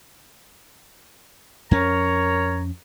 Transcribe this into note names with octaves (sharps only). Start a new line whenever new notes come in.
F2 C#4 A#4 C#5 A#5